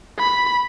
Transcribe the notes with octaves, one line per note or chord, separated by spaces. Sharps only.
B5